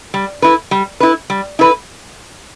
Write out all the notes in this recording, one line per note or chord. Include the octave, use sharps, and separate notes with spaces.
G3
E4 B4
G3
E4 B4
G3
E4 B4